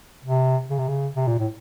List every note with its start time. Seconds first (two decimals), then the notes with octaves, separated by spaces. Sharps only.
0.25 C3
0.70 C#3
0.79 C3
0.88 C#3
1.16 C3
1.27 A#2
1.39 A2